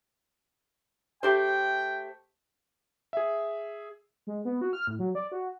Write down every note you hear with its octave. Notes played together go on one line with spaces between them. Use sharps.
A3 G4 C5 G5
G#4 E5
G#3
B3
F#4
F6
A2
F#3
D5
F#4